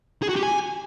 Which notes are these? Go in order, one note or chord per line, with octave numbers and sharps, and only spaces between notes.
G#4
F#4
G4
G#5